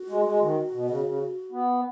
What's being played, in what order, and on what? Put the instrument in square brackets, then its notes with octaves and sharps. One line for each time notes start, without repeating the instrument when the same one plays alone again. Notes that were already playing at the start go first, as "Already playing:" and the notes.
Already playing: [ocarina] F#4
[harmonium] G#3
G#3
D#3
B2
C#3
C#3
B3